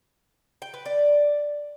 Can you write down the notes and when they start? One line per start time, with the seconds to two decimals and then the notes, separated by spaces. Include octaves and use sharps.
0.62 G5
0.74 B4
0.86 D5